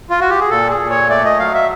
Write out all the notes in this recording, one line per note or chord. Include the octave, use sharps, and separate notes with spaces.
F4
F#4
G4
G#4
A#2 A4
G#4
A#2
C#5
A3 D5
D#5
F#3 F5
E5